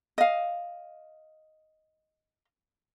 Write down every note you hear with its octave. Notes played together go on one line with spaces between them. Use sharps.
D#5 F5